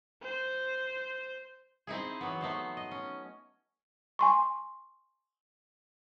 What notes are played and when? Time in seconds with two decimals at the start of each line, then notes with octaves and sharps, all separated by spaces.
0.22 C5
1.87 C4 D#4 E4 G#4
2.21 E3 F#3 B3
2.41 A3 B3 D#4 C5
2.77 D#5
2.91 C#4
4.19 G#5 C6 C#6